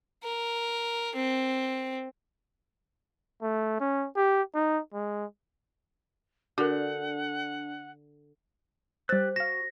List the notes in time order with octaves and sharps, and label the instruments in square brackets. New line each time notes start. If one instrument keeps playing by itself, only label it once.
[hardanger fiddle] A#4
C4
[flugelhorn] A3
C#4
G4
D#4
G#3
[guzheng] D3 [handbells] D4 [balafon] F#4 A#4 [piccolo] F#5
[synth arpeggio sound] G3 E6 [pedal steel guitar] G4 F#6 [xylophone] C5 A6
[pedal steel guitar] F#4 [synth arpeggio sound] F5 E7 [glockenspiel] A#6